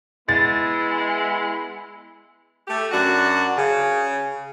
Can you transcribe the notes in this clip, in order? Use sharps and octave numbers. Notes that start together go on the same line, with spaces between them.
G#3 B3 E4 A6
A3 G4
F#2 D4 F#4
C#3